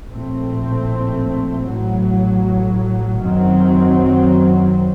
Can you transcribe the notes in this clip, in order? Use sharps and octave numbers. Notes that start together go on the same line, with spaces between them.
A#1 A2 A3 C4
A1 A2 F#3
F#2 D#3 F#3 C4